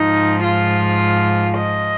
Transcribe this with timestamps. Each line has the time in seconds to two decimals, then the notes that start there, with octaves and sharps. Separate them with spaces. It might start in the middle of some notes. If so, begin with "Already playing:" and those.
Already playing: G#2 F3 D#4
0.43 F4
1.58 D#5